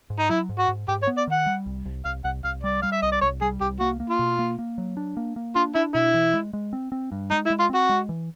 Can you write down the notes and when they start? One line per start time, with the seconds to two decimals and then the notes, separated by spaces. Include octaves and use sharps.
0.10 G#2
0.19 D#4
0.30 F#3 E4
0.49 G#2
0.59 F#4
0.68 G#2
0.88 G#2 G4
1.03 C#5
1.07 B3
1.17 D5
1.27 D#3 F#5
1.46 G3
1.66 C2
1.85 C2
2.05 C2 F5
2.24 C2 F#5
2.44 C2 F5
2.63 G3 D5
2.82 G3 F5
2.92 E5
3.02 C2 D#5
3.12 D5
3.22 C2 C#5
3.41 G3 G#4
3.61 C2 G4
3.80 A#3 F#4
4.00 A#3
4.10 F4
4.19 B2
4.39 A#3
4.59 A#3
4.78 F#3
4.97 D4
5.17 A#3
5.36 A#3
5.55 D4 F4
5.75 D4 E4
5.95 B2 E4
6.14 E3
6.34 G#3
6.53 G#3
6.73 C4
6.92 C4
7.12 G2
7.31 G#3 D#4
7.46 E4
7.50 G#3
7.60 F4
7.70 C4
7.75 F#4
7.89 G#3
8.09 E3